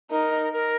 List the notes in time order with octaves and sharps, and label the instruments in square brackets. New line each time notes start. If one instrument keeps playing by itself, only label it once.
[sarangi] D#4 [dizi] A#4
[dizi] A#4